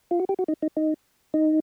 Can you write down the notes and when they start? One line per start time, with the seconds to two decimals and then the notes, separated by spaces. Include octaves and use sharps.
0.11 F4
0.20 F#4
0.29 G4
0.39 F#4
0.48 D#4
0.62 D#4
0.77 D#4
1.34 D#4